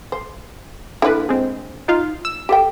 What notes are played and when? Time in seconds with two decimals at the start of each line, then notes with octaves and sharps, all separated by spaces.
0.12 C5
1.02 D3 G3 A#3 E4 B4
1.29 G#3 C4
1.88 D#4 F4 F5
2.25 E6
2.49 G4 A4 G5